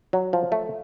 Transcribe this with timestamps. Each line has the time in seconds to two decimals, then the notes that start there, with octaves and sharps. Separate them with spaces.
0.13 F#3
0.33 F3
0.52 A3